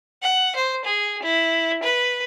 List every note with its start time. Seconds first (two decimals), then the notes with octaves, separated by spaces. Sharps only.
0.23 F#5
0.56 C5
0.85 G#4
1.22 E4
1.83 B4